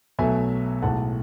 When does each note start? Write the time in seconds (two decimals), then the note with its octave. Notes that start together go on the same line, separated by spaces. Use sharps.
0.19 B1 B2 F#3 A3 E5 G#5
0.82 B1 A2 G#3 F#5 A5